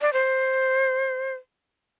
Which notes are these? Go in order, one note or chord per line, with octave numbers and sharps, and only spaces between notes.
D5
C5